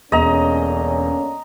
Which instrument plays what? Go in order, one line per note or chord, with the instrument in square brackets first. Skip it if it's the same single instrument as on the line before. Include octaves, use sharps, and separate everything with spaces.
[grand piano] E1 [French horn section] D3 A#3 C#4 [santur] D#5 A#5